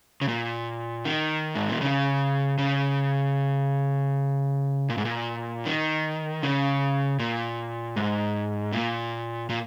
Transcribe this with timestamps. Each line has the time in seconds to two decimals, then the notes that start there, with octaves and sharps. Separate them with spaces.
0.21 C#3
0.28 A#2
1.05 D#3
1.55 G#2
1.69 A#2
1.81 C#3
2.58 C#3
4.90 A#2
4.98 G#2
5.05 A#2
5.65 D#3
6.43 C#3
7.19 A#2
7.96 G#2
8.72 A#2
9.50 A#2